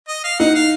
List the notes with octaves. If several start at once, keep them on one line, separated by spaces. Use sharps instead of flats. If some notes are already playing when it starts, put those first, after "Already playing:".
D#5
F5
D#4 F#5
F5